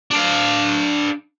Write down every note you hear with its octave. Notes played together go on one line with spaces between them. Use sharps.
D4 F5